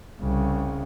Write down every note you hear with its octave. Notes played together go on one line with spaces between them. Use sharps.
C2 C#3